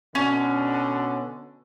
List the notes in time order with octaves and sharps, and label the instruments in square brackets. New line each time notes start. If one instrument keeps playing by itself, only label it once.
[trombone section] B2 D3 [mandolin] C#4